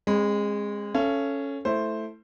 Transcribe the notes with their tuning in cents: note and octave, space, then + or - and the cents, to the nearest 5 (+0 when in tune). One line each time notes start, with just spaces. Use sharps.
G#3 -15 C4 +40 B5 +0
C#4 +0 A4 +0 F5 -40
A3 +0 E4 +0 C5 +0